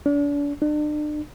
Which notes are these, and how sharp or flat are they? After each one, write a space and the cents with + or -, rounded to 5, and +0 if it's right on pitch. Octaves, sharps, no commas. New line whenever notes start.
D4 -35
D4 +40